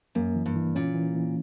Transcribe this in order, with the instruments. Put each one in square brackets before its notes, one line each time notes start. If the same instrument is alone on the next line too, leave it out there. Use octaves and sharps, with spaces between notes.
[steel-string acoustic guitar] F#2 [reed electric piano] A#3
[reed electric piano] E3
[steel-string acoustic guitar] G2
[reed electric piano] E3
[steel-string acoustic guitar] A#2 [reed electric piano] C#4
[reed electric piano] E3
E3